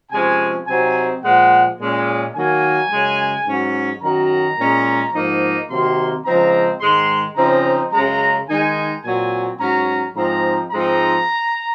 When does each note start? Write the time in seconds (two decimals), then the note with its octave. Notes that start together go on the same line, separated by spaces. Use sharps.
0.11 C3 F3 G#3 C#4 G#5
0.67 C3 F#3 C4 D#4 G#5
1.23 A#2 F3 G#3 F#5
1.79 A#2 G#3 C#4
2.34 D#3 F#3 A#3 G#5
2.90 F#2 C#3 G#3
3.46 G#2 F#3 C#4
4.02 F#2 D#3 F#3 A#5
4.58 A#2 G#3 C#4
5.13 G#2 F3 A#3 D#4
5.69 C3 D#3 F#3 A#3 C6
6.24 C#3 F3 G#3 C4 D#4 A#5
6.80 G#2 D#3 G#3 D#4 C6
7.36 C#3 F3 C4 D#4 A#5
7.92 F#2 C#3 G#3 A#5
8.48 D#3 G#3 D#4 G#5
9.04 A#2 F#3 C4 G#5
9.60 G#2 F#3 C#4 A#5
10.16 G#2 F3 C4 D#4 A#5
10.71 G#2 F3 G#3 C4 D#4 A#5